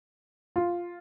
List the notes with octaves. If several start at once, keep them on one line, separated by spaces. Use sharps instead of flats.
F4